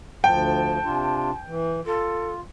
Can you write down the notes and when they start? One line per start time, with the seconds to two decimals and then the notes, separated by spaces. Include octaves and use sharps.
0.24 D2 F3 G5 A5
0.84 C3 D4 F4
1.47 E3
1.86 F4 A4